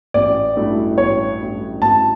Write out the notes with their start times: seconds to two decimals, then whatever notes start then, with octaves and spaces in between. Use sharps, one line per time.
0.14 A1 D5
0.56 G2 F#3 A3 E4
0.98 A1 C#5
1.39 G2 F#3 A3 E4
1.82 A1 A5